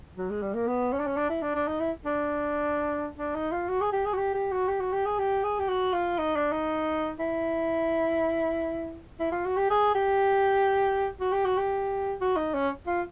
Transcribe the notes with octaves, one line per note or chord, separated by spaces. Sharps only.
F#3
G#3
G3
A#3
B3
C#4
D4
C#4
D4
E4
D4
D4
D#4
E4
D4
D4
D#4
F4
F#4
G#4
G4
G#4
F#4
G4
G4
F#4
G4
F#4
G4
G#4
G4
G#4
G4
F#4
F4
D#4
D4
D#4
E4
E4
F4
F#4
G4
G#4
G4
F#4
G4
F#4
G4
F#4
D#4
C#4
F4